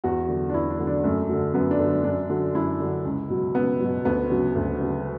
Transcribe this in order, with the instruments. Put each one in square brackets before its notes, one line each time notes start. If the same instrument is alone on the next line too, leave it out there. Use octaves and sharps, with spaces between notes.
[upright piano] E2 F#4
D3 F#3
D4
E2 E4
D4
D3 F#3
D4
F#2 A3
D3 F#3
F#2 B3
D4
D3 F#3
F#2 D4
D3 F#3
F#2 E4
D3 F#3
C#2
B2 F#3
C#2 B3
B2 F#3
D2 B3
C#3 F#3
D2
C#3 F#3